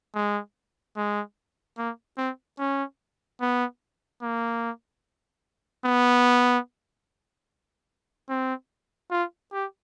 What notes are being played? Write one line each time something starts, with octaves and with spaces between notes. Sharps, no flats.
G#3
G#3
A#3
C4
C#4
B3
A#3
B3
C4
F4
G4